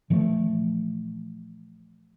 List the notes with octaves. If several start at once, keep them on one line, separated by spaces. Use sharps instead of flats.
A#2 E3 F3 A3